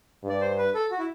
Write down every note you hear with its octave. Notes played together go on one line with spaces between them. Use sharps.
G2
D5
C5
B4
A4
F#4
E4